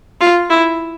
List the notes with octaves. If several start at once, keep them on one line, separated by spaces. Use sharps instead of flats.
F4
E4